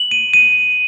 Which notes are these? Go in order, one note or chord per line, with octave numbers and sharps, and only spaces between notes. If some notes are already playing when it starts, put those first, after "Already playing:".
Already playing: F#7
D#7
D#7